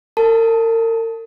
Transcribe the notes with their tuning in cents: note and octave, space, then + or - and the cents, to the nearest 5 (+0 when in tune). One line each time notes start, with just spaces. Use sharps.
A#4 -40 A5 +0